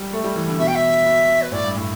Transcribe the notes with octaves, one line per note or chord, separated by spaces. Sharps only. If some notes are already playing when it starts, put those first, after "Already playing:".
Already playing: G3
A3
G3
E3
D3
B2 E5
G5
E5
B2
B4
A2 D5
G2
A2